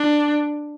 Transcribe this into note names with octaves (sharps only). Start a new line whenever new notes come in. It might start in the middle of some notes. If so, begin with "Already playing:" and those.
Already playing: D4